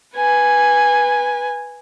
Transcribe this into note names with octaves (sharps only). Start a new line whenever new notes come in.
B4 G#5